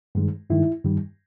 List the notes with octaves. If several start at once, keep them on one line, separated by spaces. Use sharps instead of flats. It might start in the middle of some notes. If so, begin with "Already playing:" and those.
G2 D#3 G#3
G2 D#3 G#3 E4
G2 D#3 G3